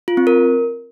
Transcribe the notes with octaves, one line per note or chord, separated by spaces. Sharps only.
F4
C4
A#4